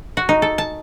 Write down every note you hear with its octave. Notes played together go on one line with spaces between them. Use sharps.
F#4
D#4
A4
A5